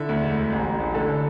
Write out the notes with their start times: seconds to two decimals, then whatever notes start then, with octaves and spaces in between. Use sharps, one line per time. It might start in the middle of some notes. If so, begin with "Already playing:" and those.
Already playing: D3 E4 E5
0.09 D2
0.23 E1
0.38 D2
0.52 A1
0.66 A1
0.80 A1
0.94 D3 A4